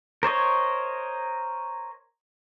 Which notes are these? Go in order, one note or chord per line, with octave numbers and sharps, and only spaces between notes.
A#4 C5 C#5 D#5